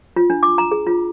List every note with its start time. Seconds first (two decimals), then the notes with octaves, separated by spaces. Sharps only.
0.16 F4
0.30 D4
0.43 D6
0.58 A#5
0.71 G#4
0.87 F4